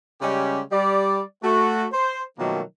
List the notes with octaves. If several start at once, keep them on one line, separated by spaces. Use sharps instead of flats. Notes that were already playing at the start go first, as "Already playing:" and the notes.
C#3 G3 G#3 C#4 G4
G3 D5
A3 F#4
C5
B2 D#3 F3 F#3 A3 A#3